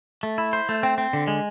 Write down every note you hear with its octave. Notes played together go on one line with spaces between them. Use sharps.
A3
E4
C5
A3
C4
C4
D3
G#3